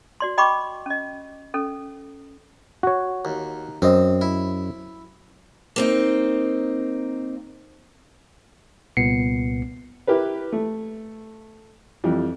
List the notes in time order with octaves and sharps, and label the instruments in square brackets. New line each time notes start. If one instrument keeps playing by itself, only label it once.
[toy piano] F#4 D5 C6
D#5 G5 B5 C#6 D6
C#4 D#5
C#4 A4
[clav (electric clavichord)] F#4 C#5
[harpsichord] D#2
[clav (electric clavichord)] F#2 D#5 [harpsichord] C4
[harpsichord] E4
[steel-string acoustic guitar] A#3 C4 D#4
[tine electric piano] C2 A#2 B3 C7 C#7
[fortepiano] E4 G4 A#4 B4
A3
F2 E3 G3